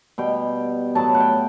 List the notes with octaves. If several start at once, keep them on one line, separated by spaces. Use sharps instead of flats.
B2 G3 B3 G5
A2 F#3 B3 A5
F#5
G5